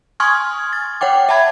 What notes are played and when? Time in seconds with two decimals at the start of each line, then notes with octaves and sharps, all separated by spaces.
0.20 G#5 C6 C#6 D#6 F6 G#6
0.73 A6
1.01 C#5 F#5 G5 D6
1.29 E5 F#5 A5 B5 G#6